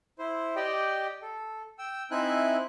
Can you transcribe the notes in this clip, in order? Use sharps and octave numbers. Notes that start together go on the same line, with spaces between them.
E4 C5
G4 D5 D#5 G5
A4
G5 E6
C4 D#4 E4 E5 G#5 F#6